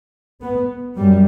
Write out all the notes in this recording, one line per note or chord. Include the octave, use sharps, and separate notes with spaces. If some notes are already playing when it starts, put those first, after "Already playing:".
B3
F#2 G3